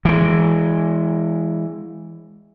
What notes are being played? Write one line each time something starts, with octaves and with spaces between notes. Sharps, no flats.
E3 G#3